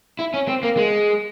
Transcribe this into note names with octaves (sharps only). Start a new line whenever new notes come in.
E4
C#4
C4
A#3
G#3